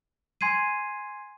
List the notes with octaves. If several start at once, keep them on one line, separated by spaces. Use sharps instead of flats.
G#5 C6 G#6 C7 D#7